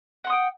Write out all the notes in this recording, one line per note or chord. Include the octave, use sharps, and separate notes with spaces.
F#5 G5 C6 D#6